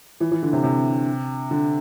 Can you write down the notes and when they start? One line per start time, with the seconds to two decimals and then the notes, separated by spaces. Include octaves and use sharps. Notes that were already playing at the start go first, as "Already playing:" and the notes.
0.20 E3
0.31 E3
0.43 D3
0.53 C3
0.63 C3
1.51 D3